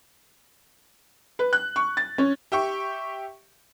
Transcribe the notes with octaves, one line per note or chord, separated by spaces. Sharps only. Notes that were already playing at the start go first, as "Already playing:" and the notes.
B4
F#6
C#6
A6
C#4
G4 E5 G5 C#6